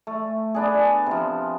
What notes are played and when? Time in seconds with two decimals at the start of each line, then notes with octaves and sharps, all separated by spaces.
0.07 A3
0.55 B3 D4 G#4
1.06 C3 F3